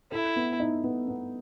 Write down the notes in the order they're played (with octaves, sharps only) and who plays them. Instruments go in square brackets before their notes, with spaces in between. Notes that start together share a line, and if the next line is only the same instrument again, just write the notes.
[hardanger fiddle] E4 [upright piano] A4
[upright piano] B3
D#4
B3
B3